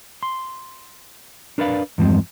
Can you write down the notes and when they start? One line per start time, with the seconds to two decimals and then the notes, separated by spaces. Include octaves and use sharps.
0.23 C6
1.58 D4 A#4 B4 D5 F5 B5
1.98 E2 G2 F3 G#3 C4